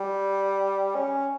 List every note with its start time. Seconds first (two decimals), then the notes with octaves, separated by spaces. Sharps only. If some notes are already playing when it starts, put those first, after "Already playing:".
Already playing: G3
0.95 C#4